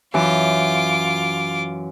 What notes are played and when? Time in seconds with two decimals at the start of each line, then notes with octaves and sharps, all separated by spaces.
0.14 F#2 E3 F4 D6